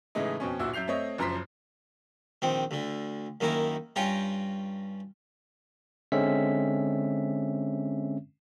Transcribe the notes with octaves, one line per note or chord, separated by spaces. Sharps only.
A2 C#3 E3 G#3 A3 D#4
F2 B2 C#4
D1 A#2 E4 F#4 E6
F#2 E5 G6 C7 F7
A3 C4 C#5 D#5
F#1 F#2 F3 A#5 C6 B6
A#1 D#3 C4
D2 D3
F#2 D#3 A#3 E4 A#5
G2 C#4 F4 G5 A#5 C#6
D3 G#3 C4 C#4 E5 B6